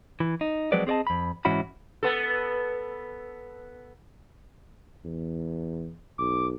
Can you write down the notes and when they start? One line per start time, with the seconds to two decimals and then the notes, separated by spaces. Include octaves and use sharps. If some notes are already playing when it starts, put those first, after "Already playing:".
0.20 E3
0.41 D#4
0.72 F3 F#3 G#3 C4 B4 D5
0.87 C4 G#4 D5 D#5 A5
1.07 F2 B5
1.45 G#2 E3 C#4 E4 F#4 B5
2.03 B3 A4
5.05 E2
6.19 B1 D6